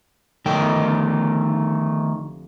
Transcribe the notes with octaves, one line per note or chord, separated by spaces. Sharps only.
F1 D3 D#3 A3 G5